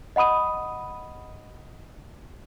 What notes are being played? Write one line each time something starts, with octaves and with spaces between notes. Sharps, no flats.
D#5 F#5 B5 D#6 D#7